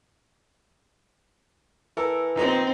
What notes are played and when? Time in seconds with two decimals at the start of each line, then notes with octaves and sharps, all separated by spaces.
1.97 E3 A4 A#4
2.35 A#1 A#2 B3 C4 D#4